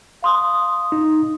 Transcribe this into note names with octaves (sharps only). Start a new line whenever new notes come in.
F5 C6 D#6
D#4